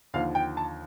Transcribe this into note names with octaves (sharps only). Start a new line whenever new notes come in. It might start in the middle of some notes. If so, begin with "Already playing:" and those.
D#2 D3 F3 F5
G5
A5